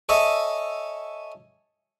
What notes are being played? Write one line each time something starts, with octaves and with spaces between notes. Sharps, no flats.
A4 C#5 D#5 E5 G#5